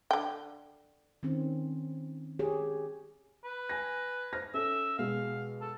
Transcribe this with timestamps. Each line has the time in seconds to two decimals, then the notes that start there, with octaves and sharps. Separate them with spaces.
0.11 D3 G5
1.23 D#3 C4 C#4
2.39 G4 G#4 C#5
3.44 B4
3.69 G#5 A#6
4.33 C5 F6 A#6
4.54 C#4 A4 E5
4.98 B2 G#3 F5
5.61 A4